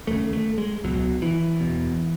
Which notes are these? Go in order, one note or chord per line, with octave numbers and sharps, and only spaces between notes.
D#2 C#3 A3
A3
G#3
C#2 B2 F#3
E3
E2 B2